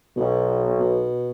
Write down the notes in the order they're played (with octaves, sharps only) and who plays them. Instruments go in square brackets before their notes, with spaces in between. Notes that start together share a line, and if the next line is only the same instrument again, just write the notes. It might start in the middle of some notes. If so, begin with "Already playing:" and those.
[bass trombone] B1 [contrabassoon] B2
[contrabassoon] B2